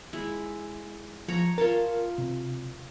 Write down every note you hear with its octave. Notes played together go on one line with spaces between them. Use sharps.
G#3 E4
F3 C#5 A#5
F4 A#4 C#5 A5
C3